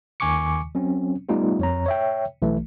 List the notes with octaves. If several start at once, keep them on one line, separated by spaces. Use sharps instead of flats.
D#2 D#3 G#5 C#6 D6 C#7
F#3 C4 C#4
G3 A3 B3 D#4 F4 G4
F2 C#5 A#5
C#5 E5 G5
B1 E3 A3